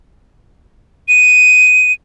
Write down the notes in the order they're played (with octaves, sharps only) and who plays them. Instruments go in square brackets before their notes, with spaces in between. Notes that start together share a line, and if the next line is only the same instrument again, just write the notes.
[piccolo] D#7